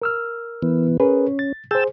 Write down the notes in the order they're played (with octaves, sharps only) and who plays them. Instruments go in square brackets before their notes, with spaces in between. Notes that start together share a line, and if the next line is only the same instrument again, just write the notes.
[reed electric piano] A#4 E6 F6
[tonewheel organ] E3 B3
[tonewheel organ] C#4 [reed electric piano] G#4 A#4 B4
[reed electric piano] A6
[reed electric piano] G#4 C5 [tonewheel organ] G5 A5 E6